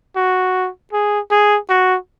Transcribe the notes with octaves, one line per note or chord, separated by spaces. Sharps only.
F#4
G#4
G#4
F#4